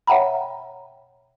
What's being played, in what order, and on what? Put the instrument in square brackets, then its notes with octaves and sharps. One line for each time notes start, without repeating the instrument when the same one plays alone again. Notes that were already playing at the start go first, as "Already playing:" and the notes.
[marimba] C#5 E5 F#5 G5 A#5 B5